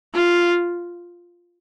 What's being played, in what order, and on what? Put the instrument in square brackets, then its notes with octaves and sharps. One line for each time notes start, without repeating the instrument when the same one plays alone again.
[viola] F4